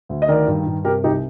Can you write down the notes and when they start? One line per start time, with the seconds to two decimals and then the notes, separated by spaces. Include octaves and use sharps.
0.09 D2
0.22 D#5
0.28 D#3 A#4 D5
0.48 G2
0.66 G2
0.85 C3 G4 A#4
1.04 C2 D#4 G4